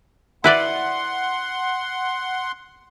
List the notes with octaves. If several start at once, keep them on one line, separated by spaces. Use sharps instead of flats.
E4 B4 D5 F#5 C6